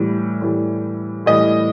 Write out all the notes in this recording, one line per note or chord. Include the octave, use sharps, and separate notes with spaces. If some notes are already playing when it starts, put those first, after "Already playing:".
Already playing: A2 E3 G3
A2 E3 G3
A2 E3 G3 D#5